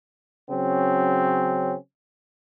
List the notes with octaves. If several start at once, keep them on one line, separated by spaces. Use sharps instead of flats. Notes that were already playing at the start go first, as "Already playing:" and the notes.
C#3 F#3 C4 C#4